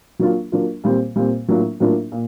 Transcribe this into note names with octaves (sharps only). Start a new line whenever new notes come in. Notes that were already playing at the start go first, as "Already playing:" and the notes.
F#3 A#3 D4 F4
F#3 A#3 D4 F4
A#2 G3 C4
A#2 G3 C4
A2 F#3 A#3 D4 F4
A2 F#3 A#3 D4 F4
A#2